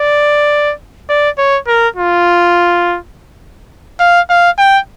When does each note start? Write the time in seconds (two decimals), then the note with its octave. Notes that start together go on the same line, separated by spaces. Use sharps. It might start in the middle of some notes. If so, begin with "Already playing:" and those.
Already playing: D5
1.09 D5
1.38 C#5
1.68 A#4
1.96 F4
4.00 F5
4.30 F5
4.59 G5